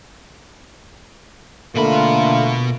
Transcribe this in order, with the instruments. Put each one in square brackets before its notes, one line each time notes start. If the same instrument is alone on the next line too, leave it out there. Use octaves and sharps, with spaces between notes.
[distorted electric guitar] B2 B5 [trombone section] D3 A3 A#3 [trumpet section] F4